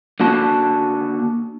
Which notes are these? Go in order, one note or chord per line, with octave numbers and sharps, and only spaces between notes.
D3 A#3 F#4 A5